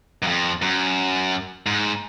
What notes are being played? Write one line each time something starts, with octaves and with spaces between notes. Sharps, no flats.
F#2
F2
F#2
G#2